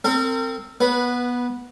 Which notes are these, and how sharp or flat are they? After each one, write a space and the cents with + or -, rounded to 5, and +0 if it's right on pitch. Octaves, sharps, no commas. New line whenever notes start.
C4 +0 A#4 -40
B3 -15 B4 +0